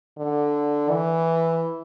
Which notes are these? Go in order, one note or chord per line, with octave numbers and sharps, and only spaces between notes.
D3
E3